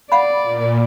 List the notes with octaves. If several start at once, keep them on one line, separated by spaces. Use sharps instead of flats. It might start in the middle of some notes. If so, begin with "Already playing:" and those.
D5 F5 F#5 B5
A#2